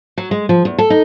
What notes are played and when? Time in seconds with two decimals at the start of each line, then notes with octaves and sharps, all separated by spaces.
0.18 F#3
0.31 G#3
0.49 F3
0.65 E2
0.78 A4
0.90 D#4